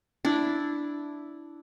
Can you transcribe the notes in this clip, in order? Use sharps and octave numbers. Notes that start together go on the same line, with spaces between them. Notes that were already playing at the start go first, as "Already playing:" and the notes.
D4 E4